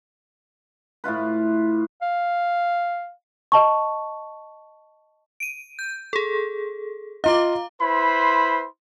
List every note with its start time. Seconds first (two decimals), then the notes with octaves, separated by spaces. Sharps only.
1.04 A2 E4 F4 B4
2.02 F5
3.52 D#5 A5 C#6
5.40 D7 D#7
5.79 G6
6.13 G#4 A4
7.24 F4 D#5 F5 A#5 D6
7.81 E4 B4 C5 B5 C6